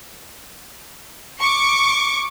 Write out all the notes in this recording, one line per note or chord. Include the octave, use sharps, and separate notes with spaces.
C#6 D6